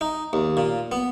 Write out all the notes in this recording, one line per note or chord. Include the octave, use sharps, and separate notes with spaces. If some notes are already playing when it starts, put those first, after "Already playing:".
D#4
D#2
A#2
B3